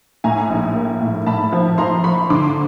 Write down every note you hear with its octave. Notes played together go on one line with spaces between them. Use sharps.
A2 G#5 A#5
A#1
A#3
A2
A2 A5 B5
F3
F3 A#5 C6
F3 B5 C#6
D3 C6 D6